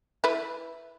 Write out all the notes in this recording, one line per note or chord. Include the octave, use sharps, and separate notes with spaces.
E4 B4